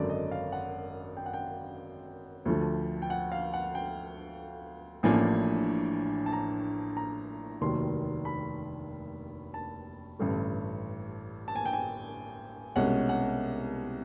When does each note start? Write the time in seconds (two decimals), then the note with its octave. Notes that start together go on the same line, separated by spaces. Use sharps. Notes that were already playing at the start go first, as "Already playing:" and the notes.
Already playing: G#1 F#2 D3 F#3 D5
0.10 D#5
0.31 F5
0.52 F#5
1.17 G5
1.26 F#5
1.34 G5
2.46 D2 D3 F3 A3
3.02 G5
3.10 F#5
3.32 F5
3.53 F#5
3.75 G5
5.03 A1 A2 F3 A#3 D4 G#5
6.26 A5
6.33 A#5
6.97 A#5
7.61 F1 D#2 D#3 F#3 C6
8.25 B5
9.54 A5
10.19 A1 G2 D3
11.48 A5
11.56 G#5
11.66 G5
11.73 G#5
12.76 C2 B2 G#3 C#4 F#5
13.09 F#5